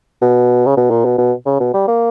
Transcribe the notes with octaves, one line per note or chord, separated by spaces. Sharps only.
B2
C#3
B2
A#2
B2
B2
C#3
B2
G3
A#3